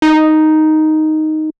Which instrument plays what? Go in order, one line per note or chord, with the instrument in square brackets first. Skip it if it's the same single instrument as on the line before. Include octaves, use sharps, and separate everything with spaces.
[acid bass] D#4